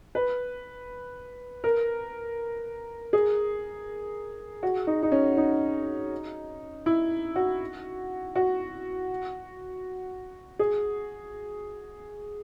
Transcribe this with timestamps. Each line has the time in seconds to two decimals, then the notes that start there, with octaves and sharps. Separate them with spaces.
0.15 B4
1.64 A#4
3.13 G#4
4.63 F#4
4.87 D#4
5.03 D#4
5.12 C#4
5.37 D#4
6.86 E4
7.36 F#4
8.36 F#4
10.59 G#4